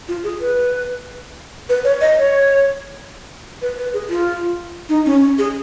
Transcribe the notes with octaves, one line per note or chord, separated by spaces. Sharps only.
F4
G#4
B4
B4
C#5
D#5
C#5
B4
B4
G#4
F4
D#4
C#4
C#4
G#4